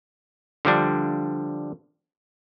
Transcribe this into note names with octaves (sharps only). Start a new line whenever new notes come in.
D3 F3 G3 D4